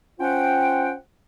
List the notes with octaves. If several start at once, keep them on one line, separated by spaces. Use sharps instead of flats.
C#4 F4 C5 F#5 G5